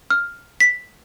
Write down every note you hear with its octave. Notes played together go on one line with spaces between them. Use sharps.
F6
B6